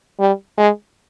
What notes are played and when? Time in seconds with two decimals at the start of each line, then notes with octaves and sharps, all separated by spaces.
0.20 G3
0.58 G#3